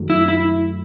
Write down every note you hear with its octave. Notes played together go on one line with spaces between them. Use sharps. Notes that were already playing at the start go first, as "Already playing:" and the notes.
Already playing: F#2 D#3 F#3 A3
E4
E4